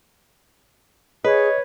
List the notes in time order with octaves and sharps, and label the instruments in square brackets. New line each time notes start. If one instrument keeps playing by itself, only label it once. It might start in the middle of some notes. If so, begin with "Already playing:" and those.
[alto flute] G#4 [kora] B4 [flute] C#5 [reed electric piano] D#5